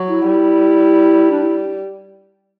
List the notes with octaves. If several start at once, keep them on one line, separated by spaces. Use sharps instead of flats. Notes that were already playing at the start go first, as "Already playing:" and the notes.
Already playing: F#3
E4
G3
D4
E4